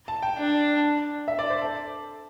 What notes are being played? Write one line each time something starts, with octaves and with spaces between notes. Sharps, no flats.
A5
G5
D4
E5
D5
C5
A4